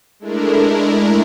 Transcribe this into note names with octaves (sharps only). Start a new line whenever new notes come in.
G#3 A3 D4 E4 A#4